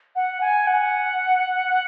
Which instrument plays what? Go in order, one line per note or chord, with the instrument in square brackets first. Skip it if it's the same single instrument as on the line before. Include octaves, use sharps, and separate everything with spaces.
[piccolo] F#5
G#5
F#5